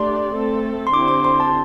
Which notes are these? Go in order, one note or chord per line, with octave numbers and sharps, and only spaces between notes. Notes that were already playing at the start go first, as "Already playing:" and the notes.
Already playing: A3 D4 G4 D5 C6
A3 C4 A4
C6
D3 C4 E4 G4 C5 D6
D6
C6
A5